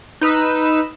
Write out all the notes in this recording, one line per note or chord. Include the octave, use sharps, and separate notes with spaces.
D#4 B4 E6